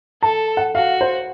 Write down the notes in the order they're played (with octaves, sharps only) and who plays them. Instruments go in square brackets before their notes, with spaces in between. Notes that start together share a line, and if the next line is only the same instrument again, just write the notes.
[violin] A4 [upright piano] A5
[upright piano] F#5
[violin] F#4 [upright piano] F5
[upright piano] C5